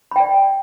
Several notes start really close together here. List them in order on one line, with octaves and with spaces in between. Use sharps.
B5 G5 D5